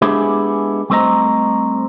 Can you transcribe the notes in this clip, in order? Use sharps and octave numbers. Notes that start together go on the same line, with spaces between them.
G#3 B3 D4 E4 G4 G#4
G3 A3 C4 C5 D#5 A#5